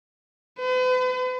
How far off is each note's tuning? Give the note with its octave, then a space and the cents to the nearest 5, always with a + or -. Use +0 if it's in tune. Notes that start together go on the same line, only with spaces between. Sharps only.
B4 +45